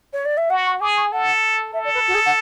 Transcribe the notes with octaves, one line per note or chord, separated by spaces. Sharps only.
C#5
D5
E5
F#4 F#5
C#6
G#4 D6
C#6
A4 F#5
A4 E5
D5
B4
F#4
G#4
F#5